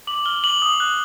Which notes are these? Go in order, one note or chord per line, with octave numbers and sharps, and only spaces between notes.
D6 F#7
F6 G7
D6 F#7
D#6
F#6